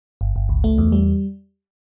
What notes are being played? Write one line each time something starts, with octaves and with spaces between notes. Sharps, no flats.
G1
G1
C#2
A3
E2
G3